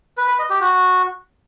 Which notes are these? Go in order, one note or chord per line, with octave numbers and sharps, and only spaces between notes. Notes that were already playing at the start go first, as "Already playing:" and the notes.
B4
B4
D#5
G4
F#4